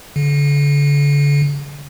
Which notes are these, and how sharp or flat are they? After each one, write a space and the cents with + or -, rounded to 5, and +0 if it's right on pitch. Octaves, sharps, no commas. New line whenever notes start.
D3 -40